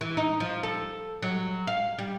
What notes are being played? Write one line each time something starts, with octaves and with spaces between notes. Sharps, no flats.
E3
D#4
F3
A4
F#3
F5
G3